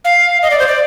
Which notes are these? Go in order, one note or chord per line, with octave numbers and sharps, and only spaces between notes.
F5
D#5
D5
C5
D5